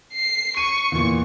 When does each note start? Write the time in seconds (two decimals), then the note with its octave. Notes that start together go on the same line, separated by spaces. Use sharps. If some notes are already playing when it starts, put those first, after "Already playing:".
0.13 C7
0.57 C#6 D#7
0.92 E2 A#2